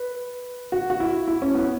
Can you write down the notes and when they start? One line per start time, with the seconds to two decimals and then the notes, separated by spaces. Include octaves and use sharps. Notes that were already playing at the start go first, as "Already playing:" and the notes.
Already playing: B4
0.72 F#4
0.90 F#4
1.00 E4
1.28 E4
1.42 C#4
1.55 B3